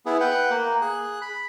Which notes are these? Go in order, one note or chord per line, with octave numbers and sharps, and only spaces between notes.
B3 E4 G#4
B4 F#5 G5
A#3
G#4 F#6
B5